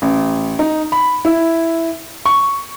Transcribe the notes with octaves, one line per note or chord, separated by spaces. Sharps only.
A1
D#4
B5
E4
C#6